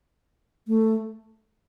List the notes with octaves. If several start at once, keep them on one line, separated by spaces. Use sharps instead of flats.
A3